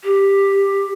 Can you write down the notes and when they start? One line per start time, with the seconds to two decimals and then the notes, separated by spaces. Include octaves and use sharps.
0.04 G4